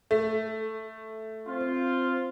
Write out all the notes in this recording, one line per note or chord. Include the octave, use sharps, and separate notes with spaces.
A3
C4 F4